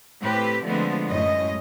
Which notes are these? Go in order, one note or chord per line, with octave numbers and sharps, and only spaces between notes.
A2 C4 G4 B4
D3 F3 G#3 A3 B3 C4
F#2 A2 G#3 C#4 D#5